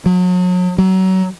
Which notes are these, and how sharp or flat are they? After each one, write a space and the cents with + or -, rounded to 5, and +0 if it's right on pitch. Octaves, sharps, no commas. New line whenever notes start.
F#3 -35
F#3 +25